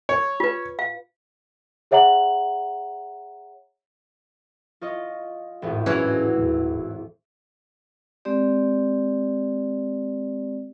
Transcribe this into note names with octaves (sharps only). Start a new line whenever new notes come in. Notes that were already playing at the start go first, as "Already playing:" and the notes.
C#5
F4 B4
F5
G#4 C#5 E5 F#5 A#5 F#7
F4 C#5 D#5
G#1 E2 A2
E3 F#3 C#4
D#1
G#3 C4 G4 D5